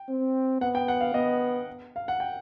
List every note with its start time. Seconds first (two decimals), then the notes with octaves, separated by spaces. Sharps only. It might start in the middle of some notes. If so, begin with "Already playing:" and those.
Already playing: G5
0.09 C4
0.61 B3 F#5
0.75 G5
0.88 F#5
1.01 F5
1.14 B3 D#5
1.96 F5
2.08 F#5
2.20 G5